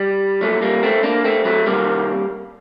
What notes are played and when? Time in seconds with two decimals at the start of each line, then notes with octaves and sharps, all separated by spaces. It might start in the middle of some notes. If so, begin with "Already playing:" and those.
Already playing: G3
0.41 C2 A#2 F#3 A3
0.62 G3 A#3
0.83 A3 C4
1.03 A#3 D4
1.24 A3 C4
1.45 F#3 A3
1.66 C2 C3 D#3 G3 A#3